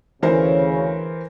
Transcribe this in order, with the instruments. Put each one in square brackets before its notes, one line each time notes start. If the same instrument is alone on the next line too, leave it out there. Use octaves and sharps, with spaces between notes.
[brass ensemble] D2 C#3 [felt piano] E3 A#4 C5